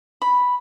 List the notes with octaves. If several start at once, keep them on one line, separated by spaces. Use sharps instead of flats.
B5